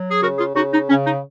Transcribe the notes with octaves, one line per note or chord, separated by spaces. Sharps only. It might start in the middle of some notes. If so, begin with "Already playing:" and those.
Already playing: F#3
G#4
C#3 F#4 A#4
F4 G#4
C#3 D#4 F#4
D#4
C#3 C#4
D#4